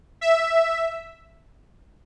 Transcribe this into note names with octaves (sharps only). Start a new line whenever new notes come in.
E5